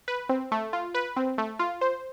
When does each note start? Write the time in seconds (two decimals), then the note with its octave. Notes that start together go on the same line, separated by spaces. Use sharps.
0.08 B4
0.29 C4
0.52 A3
0.73 F4
0.95 B4
1.16 C4
1.38 A3
1.59 F4
1.81 C5